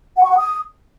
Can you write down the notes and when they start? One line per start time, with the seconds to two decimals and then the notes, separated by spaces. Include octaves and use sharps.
0.17 F#5
0.24 C#6
0.31 F#5
0.37 D#6